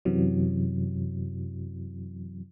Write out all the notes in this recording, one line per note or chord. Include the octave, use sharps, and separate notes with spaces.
F#2 C3 E3 F#3